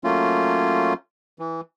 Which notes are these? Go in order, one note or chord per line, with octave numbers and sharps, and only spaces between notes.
F#3 A3 A#3 C#4 F4
E3